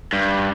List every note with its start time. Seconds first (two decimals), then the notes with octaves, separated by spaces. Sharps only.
0.13 G2